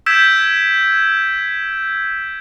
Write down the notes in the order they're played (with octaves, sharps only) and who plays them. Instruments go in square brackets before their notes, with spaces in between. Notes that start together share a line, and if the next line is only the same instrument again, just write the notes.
[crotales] E6 G6 G#6 B6 D7 E7